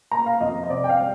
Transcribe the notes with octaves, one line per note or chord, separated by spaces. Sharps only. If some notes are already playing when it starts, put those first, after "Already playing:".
A#3 A#5
F5
F2 D#5
D#5
C3 D5
G5
F5
G3